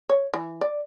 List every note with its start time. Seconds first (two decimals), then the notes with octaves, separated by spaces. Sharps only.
0.09 C#5
0.34 E3
0.61 D5